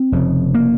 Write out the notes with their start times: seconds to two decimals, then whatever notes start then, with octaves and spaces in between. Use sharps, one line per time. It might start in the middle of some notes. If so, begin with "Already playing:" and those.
Already playing: C4
0.12 F1 F2 C#3
0.55 A#3